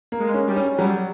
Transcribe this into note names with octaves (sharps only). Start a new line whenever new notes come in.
A#3
G#3
C#4
G3
C#4
F#3 G3